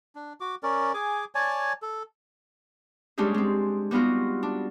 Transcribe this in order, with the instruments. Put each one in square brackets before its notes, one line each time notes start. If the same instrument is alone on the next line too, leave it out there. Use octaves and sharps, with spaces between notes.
[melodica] D4
F#4 D6
C#4 A#4 D5
G#4 G#5 D6
C#5 D5 G#5 A5
A4
[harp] G3 G#3 C#4 D4 G4 G#4
G#3 C4
G3 B3 D#4 F4 F#4
D4